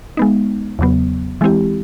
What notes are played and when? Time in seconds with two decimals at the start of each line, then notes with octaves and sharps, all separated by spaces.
0.17 G#3 B3 D#4
0.79 E2 C#3 F#3 B3
1.41 E3 G#3 C4 E4 G4